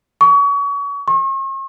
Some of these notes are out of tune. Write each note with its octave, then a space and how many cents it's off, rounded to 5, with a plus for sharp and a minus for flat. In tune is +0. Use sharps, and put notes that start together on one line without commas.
C#6 +35
C#6 -45